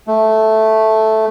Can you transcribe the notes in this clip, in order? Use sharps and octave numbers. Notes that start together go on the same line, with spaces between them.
A3